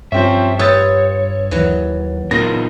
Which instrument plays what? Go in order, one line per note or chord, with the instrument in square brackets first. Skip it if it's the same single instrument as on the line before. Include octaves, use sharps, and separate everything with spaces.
[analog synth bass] G2 [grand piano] F3 C4 C#4 [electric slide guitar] E5
[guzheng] F4 G4 B4 [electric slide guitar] C#5 [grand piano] D#6 E6 A6
[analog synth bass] D#2 [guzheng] E3 F#3
[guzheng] A#2 [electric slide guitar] B3 D#4 F4 [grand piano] A#6